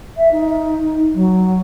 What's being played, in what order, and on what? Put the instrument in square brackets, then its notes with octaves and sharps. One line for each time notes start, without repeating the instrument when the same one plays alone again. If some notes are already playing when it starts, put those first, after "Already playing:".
[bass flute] E5
D#4
F#3